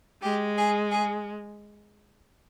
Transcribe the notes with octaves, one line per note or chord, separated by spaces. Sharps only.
G#3 G4
G#4
G#4